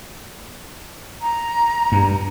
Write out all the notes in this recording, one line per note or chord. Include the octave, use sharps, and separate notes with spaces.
A#5
G2